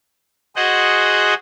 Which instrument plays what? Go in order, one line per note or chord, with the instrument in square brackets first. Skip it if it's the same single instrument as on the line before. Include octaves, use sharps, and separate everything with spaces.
[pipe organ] F#4 G#4 C5 D#5 F#5